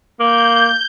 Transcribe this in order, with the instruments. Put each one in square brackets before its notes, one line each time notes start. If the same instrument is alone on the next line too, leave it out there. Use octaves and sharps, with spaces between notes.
[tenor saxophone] A#3 [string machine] G6